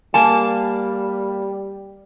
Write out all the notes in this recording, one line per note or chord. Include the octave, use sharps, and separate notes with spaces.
G3 A#3 G#5 A5